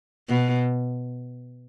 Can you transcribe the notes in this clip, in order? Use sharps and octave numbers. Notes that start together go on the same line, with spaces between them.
B2